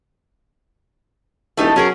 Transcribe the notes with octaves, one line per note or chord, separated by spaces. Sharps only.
E1 A3 D#4 G4
F#3 C#4 G#4 A#4